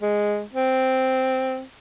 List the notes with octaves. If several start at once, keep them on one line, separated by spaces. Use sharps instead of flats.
G#3
C4